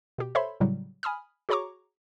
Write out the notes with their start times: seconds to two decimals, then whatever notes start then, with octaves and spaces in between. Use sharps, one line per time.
0.18 B2 G4
0.35 A4 C5 C#5 E5 B5 C6
0.60 A2 C#3 F#3 G3
1.03 G#5 B5 D#6 F6
1.49 F#4 G#4 C#5 A#5 C#6 D6